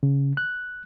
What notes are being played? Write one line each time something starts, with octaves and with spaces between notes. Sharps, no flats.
C#3
F#6